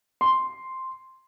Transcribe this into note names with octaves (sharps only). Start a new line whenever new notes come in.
C6